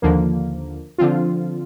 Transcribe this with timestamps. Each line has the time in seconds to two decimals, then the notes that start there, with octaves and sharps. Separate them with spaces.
0.02 D#2 D3 F3 A#3
0.98 D3 F3 C4 F4